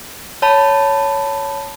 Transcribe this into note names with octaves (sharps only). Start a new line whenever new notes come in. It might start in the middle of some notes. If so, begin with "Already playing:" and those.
C#5 A5 B5